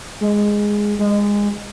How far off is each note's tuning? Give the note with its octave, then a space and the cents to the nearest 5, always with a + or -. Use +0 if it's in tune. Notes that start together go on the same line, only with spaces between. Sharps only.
G#3 -5
G#3 -20